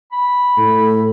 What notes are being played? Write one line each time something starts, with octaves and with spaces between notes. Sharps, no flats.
B5
A2 A4